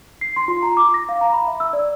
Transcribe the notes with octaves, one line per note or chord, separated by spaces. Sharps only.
C7
C6
F4
A#5
D6
A#6
F5
A#5
B5
E5
E6
D5